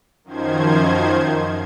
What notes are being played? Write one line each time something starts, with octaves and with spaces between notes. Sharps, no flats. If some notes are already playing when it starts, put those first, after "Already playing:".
F#2 D#3 F3 C5 G#6